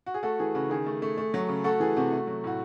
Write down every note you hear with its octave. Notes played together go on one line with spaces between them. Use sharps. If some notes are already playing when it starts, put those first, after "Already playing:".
F#4
G#4
A3 F#4 A4
E3 G#4
C#3 F#4
D#3 G#4
A3
A3
A3
F#3
C#3
A3 F#4 A4
E3 G#4
C3 F#4
A3
F#3
A2 F#4